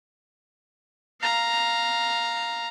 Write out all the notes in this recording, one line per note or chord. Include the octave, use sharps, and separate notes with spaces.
F5 A#5